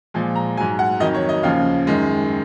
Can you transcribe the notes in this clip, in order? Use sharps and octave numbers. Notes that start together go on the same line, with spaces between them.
A#2 F3 G#3
A#5
G#2 F#3 G#5
F#5
F2 D#3 F#3 D#5
C#5
D#5
D#2 C#3 F3 F5
F#2 D#3 G#3